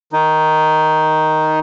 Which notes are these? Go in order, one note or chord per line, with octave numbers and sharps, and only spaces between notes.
D#3 D#4